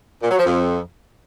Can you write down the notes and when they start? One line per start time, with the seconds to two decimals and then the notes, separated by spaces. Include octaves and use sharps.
0.23 A#2
0.30 F#3
0.38 F3
0.45 F2